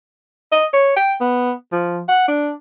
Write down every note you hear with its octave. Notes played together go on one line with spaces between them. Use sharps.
D#5
C#5
G5
B3
F3
F#5
D4